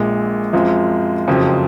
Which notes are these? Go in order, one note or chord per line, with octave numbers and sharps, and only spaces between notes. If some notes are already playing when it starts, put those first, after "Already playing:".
Already playing: A#1 A#2 G#3
F#2 F3 G#3 C4 F4
F#1 F2 C#3 F#3 C4